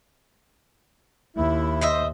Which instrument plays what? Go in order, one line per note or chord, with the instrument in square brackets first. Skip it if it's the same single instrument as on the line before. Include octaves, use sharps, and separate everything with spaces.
[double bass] D#2 [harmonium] E4
[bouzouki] C5 D#5 E5